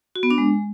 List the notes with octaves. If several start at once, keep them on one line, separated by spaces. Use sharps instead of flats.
F#4
B3
D4
G#3